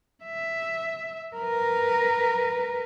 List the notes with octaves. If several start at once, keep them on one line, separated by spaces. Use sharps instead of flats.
E5
A#4 B4